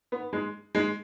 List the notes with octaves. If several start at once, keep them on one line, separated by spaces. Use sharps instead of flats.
B3
G#3
G#3